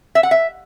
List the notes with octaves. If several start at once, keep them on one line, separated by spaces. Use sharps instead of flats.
E5
F#5
E5